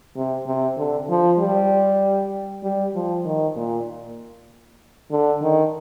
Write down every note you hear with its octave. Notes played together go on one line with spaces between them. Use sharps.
C3
C3
D3
F3
G3
G3
F3
D#3
A#2
D3
D#3